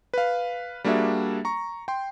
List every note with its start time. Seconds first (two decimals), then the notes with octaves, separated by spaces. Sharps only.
0.14 B4 F5
0.84 G3 A#3 D4 F#4 G#4 E5
1.45 A#5 C#6
1.88 G5 C6